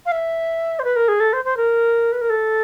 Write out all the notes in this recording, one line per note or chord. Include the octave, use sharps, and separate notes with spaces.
F5
E5
C5
B4
A#4
G#4
A4
C5
C5
A#4
B4
A#4
A4